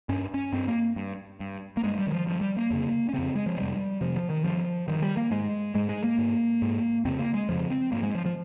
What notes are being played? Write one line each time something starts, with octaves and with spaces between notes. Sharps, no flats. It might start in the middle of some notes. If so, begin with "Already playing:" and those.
G2 C#4
C#4
G2 C4
A#3
G2
G2
A#3
G2 G#3
G3
D#3
F3
G2 F3
G3
A#3
F2 C#3
C#4
F2 C#3 C4
G#3
F3
F2 C3 G3
F2 C3 F3
F3
D#3
G2 F3
G2 D#3
G3
A#3
G#2 G#3
G#2 G#3
G#3
A#3
G#2
G#2
F2 C#3 C4
A#3
G#3
F2 C#3 F3
C4
G#2 A#3
G#3
F3
F3